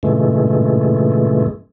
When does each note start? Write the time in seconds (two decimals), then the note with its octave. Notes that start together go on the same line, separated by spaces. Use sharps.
0.03 G2 A#2 C#3 E3 G#3 A3